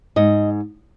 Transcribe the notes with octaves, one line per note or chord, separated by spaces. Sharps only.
G#2 D#5